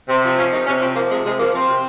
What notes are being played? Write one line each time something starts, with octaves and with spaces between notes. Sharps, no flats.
C3 C4
F3
F3 C#4
C3 D#4
C3 C#4
F3 C4
F3 A#3
C3 G#3
C3 G#3
F3 A#3
F3 C4
C3